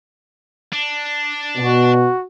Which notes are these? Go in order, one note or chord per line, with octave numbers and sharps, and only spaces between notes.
D4
B2 F#4